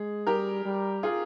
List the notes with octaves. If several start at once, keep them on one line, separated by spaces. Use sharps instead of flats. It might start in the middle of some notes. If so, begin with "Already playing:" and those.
Already playing: G#3 G#4
G3 G4 A#4
G3
F4 G#4